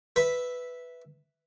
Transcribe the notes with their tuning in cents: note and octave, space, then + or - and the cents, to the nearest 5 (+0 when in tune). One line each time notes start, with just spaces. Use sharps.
B4 +5 E5 -5